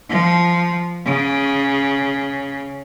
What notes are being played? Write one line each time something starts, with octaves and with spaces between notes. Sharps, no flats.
F3
C#3